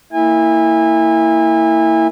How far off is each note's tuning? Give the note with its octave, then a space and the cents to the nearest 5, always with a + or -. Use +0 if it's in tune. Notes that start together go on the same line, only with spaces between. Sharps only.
A#3 -20 E4 -10 G#5 -30